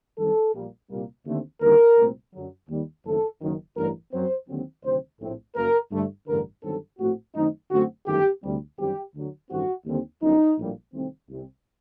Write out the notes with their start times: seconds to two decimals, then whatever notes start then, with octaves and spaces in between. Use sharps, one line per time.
0.18 F#2 D#3 G3 C4 A4
0.54 A#1 A#2 G3 A#3
0.90 C2 A#2 G3 A#3
1.26 D#2 D3 A3 C4
1.62 D#2 D3 G3 C4 A#4
1.98 C2 A#2 A3 C4
2.33 F#2 D3 F#3
2.69 D#2 D#3 G3
3.05 F#1 F#2 D#3 A3 C4 A4
3.40 F#1 F#2 D#3
3.77 A1 G2 D3 A#4
4.12 F#2 F#3 C4 C5
4.48 D#2 D3 F#3 C4
4.84 D2 C3 D#3 F#3 C4 C5
5.20 A#1 A2 A3 C4
5.56 F#1 F#2 F#3 A#3 A#4
5.92 G2 D3 A3
6.27 A1 G2 D3 A#4
6.63 G1 G2 D#3 F#3 C4 A4
6.99 A#1 A2 A3 C4 F#4
7.35 F#2 D#3 A3 C4 D#4
7.71 F#2 D3 A3 C4 F#4
8.07 G1 F#2 D#3 A3 G4
8.43 D2 C3 G3
8.79 G1 F#2 D#3 G3 C4 G4
9.14 D2 D3 F#3
9.50 A1 G2 D#3 A3 C4 F#4
9.86 D#2 D3 G3 C4
10.22 G1 F#2 D#3 D#4
10.58 A#1 A2 G3 A#3
10.94 C2 C3 D#3 A3 C4
11.29 C2 C3 G3 C4